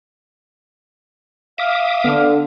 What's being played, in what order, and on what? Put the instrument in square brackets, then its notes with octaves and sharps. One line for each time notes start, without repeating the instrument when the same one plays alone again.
[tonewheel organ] E5 D6 D#6 [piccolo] F5
[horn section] D3 [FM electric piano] B3